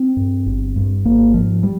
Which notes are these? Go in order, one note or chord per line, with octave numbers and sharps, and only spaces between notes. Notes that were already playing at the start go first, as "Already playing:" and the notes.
Already playing: C4
G2
G1
G2
G#1 A#3
G#2 F3
G3